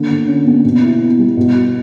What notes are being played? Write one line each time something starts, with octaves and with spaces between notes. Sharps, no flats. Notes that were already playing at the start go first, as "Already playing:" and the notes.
Already playing: D3 A#3
D3
C#4
A#3
B2
E4
B3
G3
B2
F#4